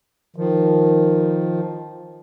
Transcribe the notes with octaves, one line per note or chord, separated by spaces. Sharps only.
D#3 F3